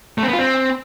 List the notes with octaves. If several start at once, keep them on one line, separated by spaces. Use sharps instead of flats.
A3
C4
B3
F4
C4